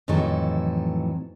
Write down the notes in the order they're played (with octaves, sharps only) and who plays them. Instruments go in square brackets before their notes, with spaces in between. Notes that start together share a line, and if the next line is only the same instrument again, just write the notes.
[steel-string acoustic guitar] F2 A2 D#3 E3 F#3 A4